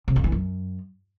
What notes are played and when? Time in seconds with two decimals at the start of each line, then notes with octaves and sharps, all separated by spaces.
0.08 C3
0.16 F2
0.24 E3
0.32 F#2